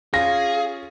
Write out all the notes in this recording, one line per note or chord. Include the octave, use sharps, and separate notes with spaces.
C#4 F4 G#4 F5 A#6